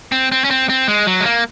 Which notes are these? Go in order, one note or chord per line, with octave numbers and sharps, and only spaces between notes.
C4
C4
C#4
C4
C4
G#3
F#3
G#3
A#3